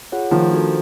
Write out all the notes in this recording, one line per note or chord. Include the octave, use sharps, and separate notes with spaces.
F4 G#4 C#5 F#5
D#3 F3 A3
D4 F#4 A4 C5